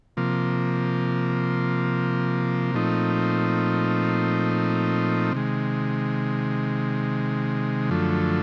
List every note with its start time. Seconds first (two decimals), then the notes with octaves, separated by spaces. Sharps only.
0.17 C3 F3 A#3
2.74 A#2 F3 A3 C4 D#4
5.32 C3 D#3 G#3
7.90 F#2 D3 F3 A3